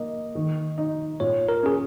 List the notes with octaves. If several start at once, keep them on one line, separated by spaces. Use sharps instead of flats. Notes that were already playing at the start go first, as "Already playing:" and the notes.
Already playing: A#3 D#5
D#3
D#4
A#2 C#5
A#4
C#4 G#4